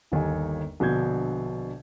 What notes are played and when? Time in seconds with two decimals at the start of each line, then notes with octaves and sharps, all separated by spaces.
0.12 G1 D#2 D#4 G#5
0.80 A#1 B2 D3 G6 G#6